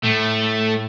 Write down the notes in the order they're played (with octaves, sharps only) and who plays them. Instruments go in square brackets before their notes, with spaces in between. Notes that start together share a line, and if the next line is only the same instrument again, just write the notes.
[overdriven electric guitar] A2 [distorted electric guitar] A3